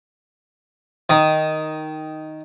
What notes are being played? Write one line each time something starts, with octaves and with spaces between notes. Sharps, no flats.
D#3